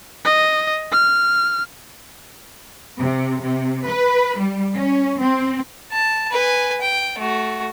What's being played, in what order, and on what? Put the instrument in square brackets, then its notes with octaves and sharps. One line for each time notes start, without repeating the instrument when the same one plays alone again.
[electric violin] D#5
F6
[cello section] C3
C3
B4
G3
C#4
C4
[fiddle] A5
B4 G#5
G5
A3 F#4